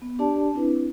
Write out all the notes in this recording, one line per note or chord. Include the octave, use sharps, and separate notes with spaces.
B3
D4 G4 D5 A5
C4 D4 E4 B4